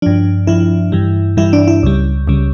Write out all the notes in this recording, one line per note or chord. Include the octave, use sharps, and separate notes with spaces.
G2 F3 D4
G2 F3 E4
G2 E3 G3
G2 E3 G3 E4
D4
E4
C#2 C#3 G3
C#2 C#3 G3